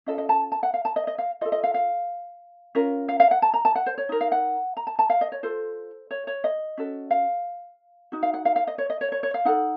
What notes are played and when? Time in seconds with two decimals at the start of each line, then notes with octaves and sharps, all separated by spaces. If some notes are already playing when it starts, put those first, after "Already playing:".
0.06 C#4 F4 A4 D#5
0.18 D#5
0.29 A5
0.52 A5
0.63 F#5
0.74 F5
0.85 A5
0.96 D#5
1.07 D#5
1.18 F5
1.41 F4 D#5
1.45 A4
1.52 D#5
1.64 F5
1.74 F5
2.75 C#4 F4 A#4
3.08 F5
3.20 F5
3.31 F#5
3.42 A5
3.54 A#5
3.65 A5
3.75 F#5
3.86 C5
3.98 C#5
4.09 D#4 A#4
4.21 F5
4.32 F#5
4.77 A#5
4.87 A5
4.99 A5
5.10 F5
5.21 D#5
5.32 C#5
5.43 F4 A4 C5
6.11 C#5
6.27 C#5
6.44 D#5
6.77 C#4 F#4 A4
7.11 F5
8.12 D#4 F#4
8.23 F5
8.34 F#5
8.45 F5
8.56 F5
8.67 D#5
8.78 C#5
8.90 D#5
9.01 C#5
9.12 C#5
9.23 C#5
9.34 F5
9.45 D#4 A4 F#5